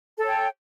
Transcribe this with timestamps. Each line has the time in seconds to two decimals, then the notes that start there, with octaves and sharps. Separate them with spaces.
0.18 A4
0.23 C#5
0.27 G5